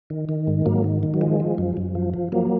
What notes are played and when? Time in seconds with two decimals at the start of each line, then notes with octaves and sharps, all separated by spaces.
0.10 D#3
0.29 D#3
0.48 G#2
0.66 G#2 F#3 A#3
0.84 D#3
1.03 D#3
1.14 F#3
1.21 F3 G#3
1.40 F3
1.58 F#2
1.77 F#2
1.95 F3
2.14 F3
2.32 F3 F#3 A#3